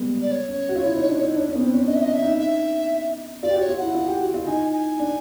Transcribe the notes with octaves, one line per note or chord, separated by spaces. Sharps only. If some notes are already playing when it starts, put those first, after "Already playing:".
Already playing: G3 G#3 A#3 B3
D5
C#5
C#4
F#4
F4
E4
D#4
D4
D#4
D4
C#4
B3
C4
C#4
D4 D#5
E5
D4 D#5
E5
D#4
E5
F4 D5
G4
F#4
C#5
F4
E4 F#5
F4
G4
F#4
F4
D#4 G#5
G#5
D4